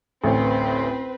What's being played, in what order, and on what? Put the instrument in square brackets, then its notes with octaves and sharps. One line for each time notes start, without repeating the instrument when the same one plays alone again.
[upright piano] A1 D2 [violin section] C4 B4